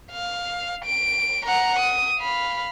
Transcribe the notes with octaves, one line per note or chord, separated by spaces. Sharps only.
F5
D7
F#5 A#5
D#6
F5 B5